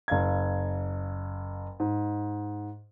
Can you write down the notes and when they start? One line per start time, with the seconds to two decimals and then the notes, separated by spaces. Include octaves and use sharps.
0.08 F#1 F5 G#6
1.80 G#2